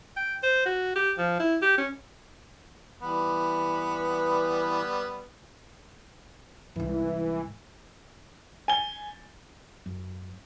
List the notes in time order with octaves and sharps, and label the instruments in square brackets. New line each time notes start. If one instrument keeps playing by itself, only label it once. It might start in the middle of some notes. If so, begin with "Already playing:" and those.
[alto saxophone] G5
C5
F#4
G4
F3
E4
G4
C#4
[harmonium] E3 [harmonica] G3 B3
[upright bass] C2 G#2 [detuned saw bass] E3
[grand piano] G#5 G7
[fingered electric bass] F#2